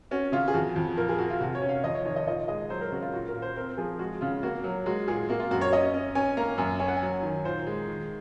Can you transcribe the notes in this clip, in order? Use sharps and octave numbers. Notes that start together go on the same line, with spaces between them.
C#4 F#4
C#3 F4
G#4
F2 F#4
F2
A#2 A#4
G#4
A#2 F#4
F4
C3 F#4
C#5
C#4
F5
F2 D#5
C#5
D#3 C#5
D#5
A#2 D#5
G#3 D#5
F#3 C5
A#4
C#3 F#4
F4
A#2 F#4
A#4
A#2
C5
C4 A#4
F3 G#4
G#3 F#4
C#3 F4
A#3 F#4
F#3
G#3 F#4
A#2 G#4
A#3 F#4
F4
F#2 F#4
C#5
C#4 D#5
C#4
C#4 G#5
A#3 A#5
F#2 G#5
C#4 G#5
F#5
G#5
F#3
D#3
A#2 C5
G#3
D#3